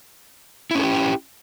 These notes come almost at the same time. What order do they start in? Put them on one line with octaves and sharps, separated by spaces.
E4 C#4 A4 G4